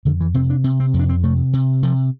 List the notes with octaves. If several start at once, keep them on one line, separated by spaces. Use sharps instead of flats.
F2 D3
E3
C3 C4
D4
C3 C4
C4
F2
D4
C4
C3 A3
C3
C3 F3